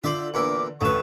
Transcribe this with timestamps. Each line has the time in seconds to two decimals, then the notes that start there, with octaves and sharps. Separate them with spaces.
0.04 D3 F4 C5 D5 E5 F#7
0.34 E2 A#2 E5 D6
0.81 A1 D2 A3 B4 C#6 E7